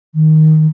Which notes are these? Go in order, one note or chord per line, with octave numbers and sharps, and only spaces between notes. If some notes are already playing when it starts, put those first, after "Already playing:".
D#3